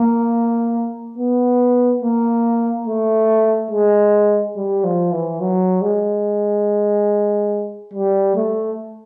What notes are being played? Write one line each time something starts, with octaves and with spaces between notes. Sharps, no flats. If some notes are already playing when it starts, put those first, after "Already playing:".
Already playing: A#3
B3
A#3
A3
G#3
G3
F3
E3
F#3
G#3
G3
A3